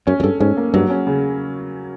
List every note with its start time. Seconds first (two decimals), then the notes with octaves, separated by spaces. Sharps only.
0.07 F#2 C#4
0.20 F#2
0.23 G2 A4
0.40 G#2 C#4
0.57 A#3
0.74 G2 F#3
0.90 C#4
1.07 C#3